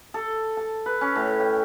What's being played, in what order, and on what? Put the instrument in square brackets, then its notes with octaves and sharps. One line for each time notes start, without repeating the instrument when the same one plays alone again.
[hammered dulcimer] A4
A5
B4
C#4
A2
G5